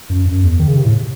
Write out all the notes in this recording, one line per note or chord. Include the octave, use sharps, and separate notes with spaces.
F#2
F#2
E2
D#3
C#3
C3
A2